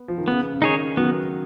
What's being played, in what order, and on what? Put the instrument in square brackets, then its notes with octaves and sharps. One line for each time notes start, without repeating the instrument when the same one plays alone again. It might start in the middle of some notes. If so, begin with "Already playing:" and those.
Already playing: [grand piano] B3
F3
D#3
[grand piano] C#3 [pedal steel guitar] B3
[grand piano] C#3
[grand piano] D#3 [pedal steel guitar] D#4 G#4 C#5
[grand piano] D#3 F#3 [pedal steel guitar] B3